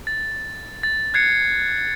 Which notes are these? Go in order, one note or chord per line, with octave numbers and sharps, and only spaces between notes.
A6
A6
F#6 G#6 C7 C#7